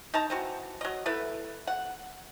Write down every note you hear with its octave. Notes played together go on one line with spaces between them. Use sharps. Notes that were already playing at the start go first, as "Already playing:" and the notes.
D#4 A5 A#5
E3 C4 F#4
F#3 D#5
A3 E4 B4
F#5